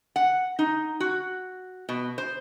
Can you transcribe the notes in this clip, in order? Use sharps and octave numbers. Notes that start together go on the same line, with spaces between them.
F#5
D#4
F#4
B2
C5